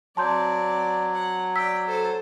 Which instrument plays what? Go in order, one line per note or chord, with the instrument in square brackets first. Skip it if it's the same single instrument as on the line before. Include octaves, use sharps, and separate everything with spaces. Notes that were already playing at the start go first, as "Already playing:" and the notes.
[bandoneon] F#3 [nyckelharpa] C4 D5 [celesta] A5 C6 G6
[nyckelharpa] F#5
[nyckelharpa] D5 G5 [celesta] E6 B6
[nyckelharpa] A4 C5